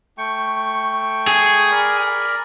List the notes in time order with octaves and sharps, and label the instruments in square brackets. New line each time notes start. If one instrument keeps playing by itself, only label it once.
[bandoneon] A3 G5 C#6
[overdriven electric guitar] G#4
[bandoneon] A#4 D5 B5